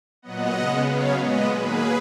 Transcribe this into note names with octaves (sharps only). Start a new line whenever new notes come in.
A#2 F#3 B3 D#5 F#5
C#3 G#3 B3
C#3 F#3 B3 C#5 F5
A#2 G#3 B3 B4 D#5
D#3 F#3 A#3 G#4 B4